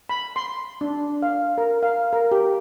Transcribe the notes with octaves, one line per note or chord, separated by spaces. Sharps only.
B5
C6
D4
F5
A#4
F5
A#4
G4